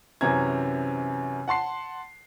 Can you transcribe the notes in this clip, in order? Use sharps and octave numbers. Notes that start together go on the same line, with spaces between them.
F#2 C3 E3 C#4 A#5 G#6
F#5 A5 C6 C7